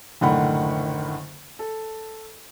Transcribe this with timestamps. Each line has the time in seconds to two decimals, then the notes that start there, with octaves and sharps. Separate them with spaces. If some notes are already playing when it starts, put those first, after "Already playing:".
0.21 F#1 A2 D3 D#3 F#5 B5
1.59 A4